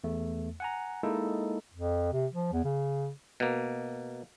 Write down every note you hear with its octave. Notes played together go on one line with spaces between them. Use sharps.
E2 A3
F#5 G#5 A#5
G#3 A#3 D#4 E4 A4
F2
C3
F3
E2
C#3
B2 A#3